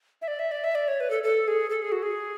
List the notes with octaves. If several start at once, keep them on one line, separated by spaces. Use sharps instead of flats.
E5
D5
E5
D5
E5
D5
C#5
B4
A4
A4
G#4
A4
G#4
F#4
G#4